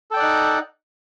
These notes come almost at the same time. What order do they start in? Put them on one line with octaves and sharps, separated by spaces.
A4 G5 D5 F#5 D#4